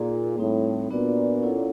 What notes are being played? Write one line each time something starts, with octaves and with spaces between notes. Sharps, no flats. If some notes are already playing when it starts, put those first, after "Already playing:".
Already playing: A#2 A#3 D#4 G#4
A2 G3 C4 D#4
A#2 B3 D4 F#4 B4 D5
C#4 E4 A4 C#5 F#5